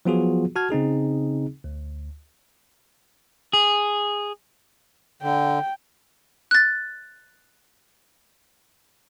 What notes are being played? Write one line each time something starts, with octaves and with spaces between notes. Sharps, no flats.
F3 F#3 B3 F4 F#4 G#4
F#4 A5 F6 G#6
C#3 C4 D#4 G#4
D2
G#4
D3 G5
F#6 A6